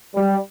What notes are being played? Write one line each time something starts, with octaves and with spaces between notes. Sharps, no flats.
G3